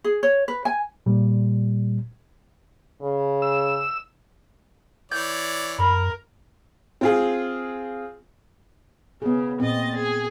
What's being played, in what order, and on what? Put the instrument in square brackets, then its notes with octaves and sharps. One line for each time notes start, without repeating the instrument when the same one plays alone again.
[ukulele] G#4
C#5
B4
G#5
[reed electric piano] A#2 G3
[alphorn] C#3
[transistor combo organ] E6
[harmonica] E3 C#5 D5 [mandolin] G6
[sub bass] F#2 [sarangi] A#4 [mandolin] B5
[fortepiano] C4 F4 G#4
[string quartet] C#3 [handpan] B3 G#4
[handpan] A#2 C4 [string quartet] D#5 A6
[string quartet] G#4